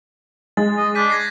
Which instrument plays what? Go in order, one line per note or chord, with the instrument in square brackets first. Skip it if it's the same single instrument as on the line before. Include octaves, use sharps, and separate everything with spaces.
[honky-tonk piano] G#3 [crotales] A6
[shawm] D#5
[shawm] D4 [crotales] G6 B6 D#7
[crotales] G#6 A#6 C7